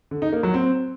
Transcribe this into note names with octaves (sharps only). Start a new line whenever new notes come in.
D3
D#4
A#3
F#3
C4